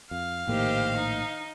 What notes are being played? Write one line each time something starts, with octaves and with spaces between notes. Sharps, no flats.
F2 F5
A#1 A2 D#3 A#3 G4 C5
D#4